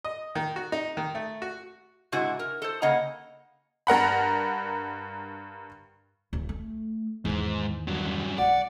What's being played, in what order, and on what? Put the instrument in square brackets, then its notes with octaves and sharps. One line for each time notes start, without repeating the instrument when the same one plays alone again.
[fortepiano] D#5
D#3
F#4
D#4
D#3
A3
F#4
[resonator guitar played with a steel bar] G#2 C3 E4 F#4
A#4
A4 C5
C#3 A#3 D#5 F#5 A#5
[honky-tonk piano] G2 A#4 F#5 B5
[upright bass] D1
A3
[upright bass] E2 D#3 [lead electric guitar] G#2
[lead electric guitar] G2 F#3
[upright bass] B1 [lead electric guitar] D5 [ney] F#5